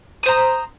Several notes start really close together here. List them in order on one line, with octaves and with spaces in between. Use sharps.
D#6 C5 A#5